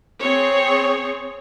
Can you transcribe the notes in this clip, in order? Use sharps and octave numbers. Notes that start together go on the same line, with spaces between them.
C4 G#4 C#5